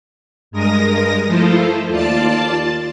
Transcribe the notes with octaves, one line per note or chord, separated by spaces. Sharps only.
G2 G#3 A#4 D#6 A#6
F3 A3 E4 F4 A4 C5
D#2 F4 D5 A5 A6